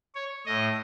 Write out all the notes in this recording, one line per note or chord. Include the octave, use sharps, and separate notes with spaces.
C#5
A2 D#5